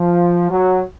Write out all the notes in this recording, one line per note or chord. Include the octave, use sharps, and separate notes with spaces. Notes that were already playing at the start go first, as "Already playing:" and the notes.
Already playing: F3
F#3